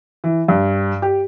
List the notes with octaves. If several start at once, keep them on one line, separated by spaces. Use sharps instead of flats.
E3
G2
G4